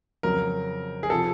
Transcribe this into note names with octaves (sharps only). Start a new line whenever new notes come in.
F2 C#3 F#3 A#4
G#4
C3 F3 A4